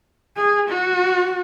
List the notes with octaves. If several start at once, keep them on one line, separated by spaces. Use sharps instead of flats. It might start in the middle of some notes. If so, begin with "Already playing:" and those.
G#4
F#4